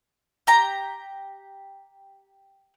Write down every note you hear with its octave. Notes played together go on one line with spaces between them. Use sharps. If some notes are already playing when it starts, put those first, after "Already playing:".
G4 A#5